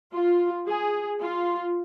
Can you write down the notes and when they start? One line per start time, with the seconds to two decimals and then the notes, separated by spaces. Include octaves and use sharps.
0.13 F4
0.68 G#4
1.20 F4